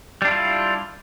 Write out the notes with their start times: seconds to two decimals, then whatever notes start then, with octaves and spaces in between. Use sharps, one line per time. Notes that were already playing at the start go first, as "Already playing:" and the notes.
0.22 G3
0.25 D4
0.28 E4
0.31 F4